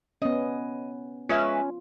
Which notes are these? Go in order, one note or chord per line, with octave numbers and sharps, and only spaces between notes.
B3 C#4 D#5
G#3 C#4 F4 B4 E5